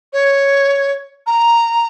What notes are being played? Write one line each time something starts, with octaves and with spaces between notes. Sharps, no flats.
C#5
A#5